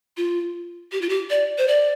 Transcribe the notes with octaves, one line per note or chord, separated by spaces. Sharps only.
F4
G4
F4
G4
D5
C5
D5